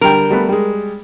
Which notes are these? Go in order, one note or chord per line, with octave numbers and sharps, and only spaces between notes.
D3 G3 A#4 G5
G3 A3 B3
G3 G#3